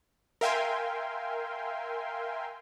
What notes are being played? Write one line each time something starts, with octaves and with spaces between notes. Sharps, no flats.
A#4 E5 F5 G5 G#5 C6